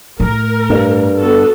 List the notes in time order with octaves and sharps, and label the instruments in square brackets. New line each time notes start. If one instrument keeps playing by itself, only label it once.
[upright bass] A2 [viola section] A#4
[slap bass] G2
[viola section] B3 F#4 A4